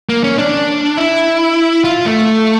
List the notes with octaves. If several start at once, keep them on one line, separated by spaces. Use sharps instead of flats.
A#3
C#4
D4
E4
F4
A3